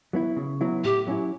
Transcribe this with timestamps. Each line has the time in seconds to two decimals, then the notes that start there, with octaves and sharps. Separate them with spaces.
0.13 F#3 B3 E4
0.37 C#3
0.61 F#3 B3 E4
0.84 A2 G4
1.07 F#3 C#4 E4